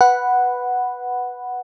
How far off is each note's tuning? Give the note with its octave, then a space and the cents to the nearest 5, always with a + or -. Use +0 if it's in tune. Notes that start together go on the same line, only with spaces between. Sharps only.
B4 +0 F#5 +0 B5 +0